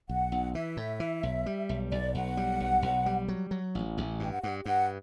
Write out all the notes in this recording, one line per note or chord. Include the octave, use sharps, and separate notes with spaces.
B1 F#5
B1
E3 E5
A2
E3
B1
G3
B1
B1 D5
B1 F#5
G3
B1
B1
G3
F#3
F#3
A1
A1
G2 G5
F#5
G2 F#5
G2 F#5